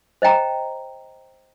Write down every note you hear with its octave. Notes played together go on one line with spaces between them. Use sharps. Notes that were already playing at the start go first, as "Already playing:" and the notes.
C5 D#5 G5 A#5